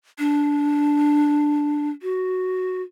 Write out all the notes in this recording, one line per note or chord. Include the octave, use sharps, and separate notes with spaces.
D4
F#4